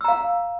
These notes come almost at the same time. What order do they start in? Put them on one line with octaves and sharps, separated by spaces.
E6 A#5 F5